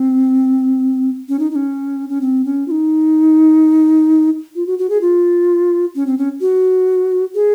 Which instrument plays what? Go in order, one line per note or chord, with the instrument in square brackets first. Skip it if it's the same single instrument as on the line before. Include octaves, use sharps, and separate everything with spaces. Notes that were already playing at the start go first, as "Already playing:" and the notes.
Already playing: [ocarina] C4
C#4
D#4
D#4
C#4
C#4
C4
C#4
F4
D#4
F4
F#4
F#4
G#4
F4
C#4
C4
C#4
F#4
G#4